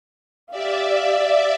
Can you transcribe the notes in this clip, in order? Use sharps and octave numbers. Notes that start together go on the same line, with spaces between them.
G4 D5 E5 F5